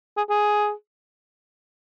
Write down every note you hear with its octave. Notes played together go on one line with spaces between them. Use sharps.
G#4
G#4